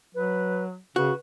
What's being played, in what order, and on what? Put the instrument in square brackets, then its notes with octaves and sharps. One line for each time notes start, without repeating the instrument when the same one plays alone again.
[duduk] F#3 [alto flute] B4
[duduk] C#3 [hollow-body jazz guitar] F#4 [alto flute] B4